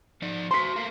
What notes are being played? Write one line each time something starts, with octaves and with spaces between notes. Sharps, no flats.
F3 D#4 D5
F#4 C5 C6 B6
A3 A#4 F5